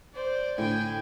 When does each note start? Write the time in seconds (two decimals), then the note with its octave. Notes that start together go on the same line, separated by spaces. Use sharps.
0.14 C5 D5
0.58 A2 D3 G5 G#5